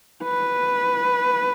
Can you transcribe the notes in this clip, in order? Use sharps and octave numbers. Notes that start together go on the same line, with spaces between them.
B4